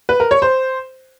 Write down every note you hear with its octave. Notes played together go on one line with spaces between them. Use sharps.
B4
A#4
C#5
C5